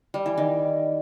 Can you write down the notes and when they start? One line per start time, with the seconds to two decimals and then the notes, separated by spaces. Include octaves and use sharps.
0.14 G3
0.26 E3
0.38 D#3